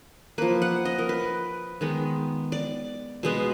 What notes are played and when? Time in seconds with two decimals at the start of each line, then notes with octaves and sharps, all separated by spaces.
0.38 F3 A#3 B4
0.62 F#5
0.85 D#5
0.99 A#4
1.09 B4
1.81 D#3 G#3 B3
2.52 D5
3.23 B2 G#3 B3